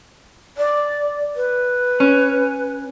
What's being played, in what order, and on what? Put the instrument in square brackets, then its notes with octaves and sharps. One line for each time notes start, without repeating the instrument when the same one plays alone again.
[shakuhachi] D5
B4
[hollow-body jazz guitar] C#4